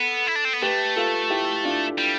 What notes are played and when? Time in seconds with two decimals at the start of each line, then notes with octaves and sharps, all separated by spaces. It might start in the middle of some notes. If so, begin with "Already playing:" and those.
Already playing: B3 A4
0.27 E4
0.35 D4
0.45 C4
0.53 B3
0.62 A3 G4 B4
0.96 F4 A4
1.30 E4 G4
1.64 D4 F4
1.98 G3